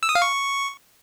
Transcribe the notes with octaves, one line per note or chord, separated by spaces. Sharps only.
E6
D#6
F5
C#6